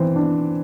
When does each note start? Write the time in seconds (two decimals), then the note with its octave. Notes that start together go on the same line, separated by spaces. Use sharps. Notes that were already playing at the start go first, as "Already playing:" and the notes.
Already playing: E3 C4 C5
0.16 D4